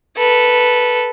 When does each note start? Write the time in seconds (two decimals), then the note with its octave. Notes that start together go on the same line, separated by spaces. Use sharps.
0.17 A4 B4